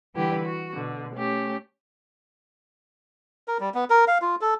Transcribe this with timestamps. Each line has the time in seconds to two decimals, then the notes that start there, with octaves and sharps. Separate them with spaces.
0.15 D3 E3 G3 E4 G4 B4
0.45 F#4
0.74 B2 D3
1.16 A3 C#4 G4
3.48 A#4
3.60 G3
3.74 B3
3.90 A#4
4.08 F5
4.22 F4
4.41 A4